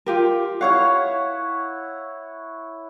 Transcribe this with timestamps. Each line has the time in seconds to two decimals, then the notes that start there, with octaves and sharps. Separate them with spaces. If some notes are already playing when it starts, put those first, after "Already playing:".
0.06 F4 G4 A#4
0.61 E4 C#5 F5 F#5